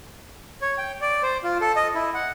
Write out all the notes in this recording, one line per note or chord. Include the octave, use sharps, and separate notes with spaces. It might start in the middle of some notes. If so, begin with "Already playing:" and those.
C#5
G5
D5
C5
F4
A4
D#5
E4
F#5